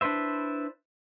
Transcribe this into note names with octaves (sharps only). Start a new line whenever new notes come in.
D4 E4 B4 C5 E5